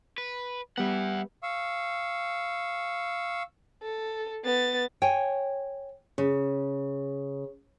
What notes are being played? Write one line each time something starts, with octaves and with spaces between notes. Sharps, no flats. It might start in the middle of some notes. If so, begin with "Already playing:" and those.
B4
G3 B3 E5 F#5
F5 C#6 E6
A4
B3 A6
C#5 G5 G#5
C#3